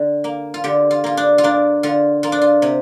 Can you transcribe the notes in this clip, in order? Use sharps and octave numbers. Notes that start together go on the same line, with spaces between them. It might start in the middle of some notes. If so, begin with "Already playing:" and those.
Already playing: D3
A#3
F4
D3 G4
F4
A#3 F4
D4
F4
A#3 D4
D3 F4
A#3 F4
D4
F4
C3